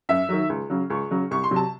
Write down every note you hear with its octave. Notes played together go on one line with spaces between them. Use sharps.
F#2 E5
D#3 F#3
C#2
C#3 F#3
C#2 C#6
C#3 F#3
C2 C#6
C6
C3 F#3
A5